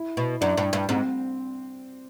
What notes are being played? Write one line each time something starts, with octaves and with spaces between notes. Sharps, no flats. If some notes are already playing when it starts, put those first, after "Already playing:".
Already playing: E4
B2
F#2 D4
G2
G2
G#2 C4